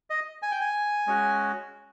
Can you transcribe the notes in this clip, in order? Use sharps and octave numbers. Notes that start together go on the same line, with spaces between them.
D#5
G#5
G5
G#5
G#3 C#4 F#4